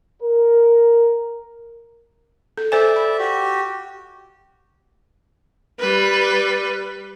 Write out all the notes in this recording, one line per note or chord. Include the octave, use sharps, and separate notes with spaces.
A#4
A4
A4 C5 D5 E5 G#5
B5
F#4 G4
G3 B4